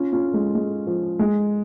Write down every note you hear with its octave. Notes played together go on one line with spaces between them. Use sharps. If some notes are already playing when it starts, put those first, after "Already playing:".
Already playing: C#4 F4
C#4 F4
G#3
G#3
F3
G#3